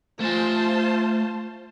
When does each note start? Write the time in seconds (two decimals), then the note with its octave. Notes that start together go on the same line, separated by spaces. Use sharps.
0.20 A3 F4 C5 G#5 A5